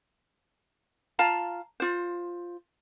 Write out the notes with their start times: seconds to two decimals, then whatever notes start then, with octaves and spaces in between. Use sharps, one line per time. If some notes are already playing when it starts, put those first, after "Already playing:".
1.19 F4 F5 A5 A#5
1.80 F4 C5